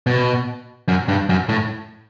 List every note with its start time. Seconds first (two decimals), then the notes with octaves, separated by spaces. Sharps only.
0.07 B2
0.88 F#2
1.08 G2
1.29 F#2
1.49 A2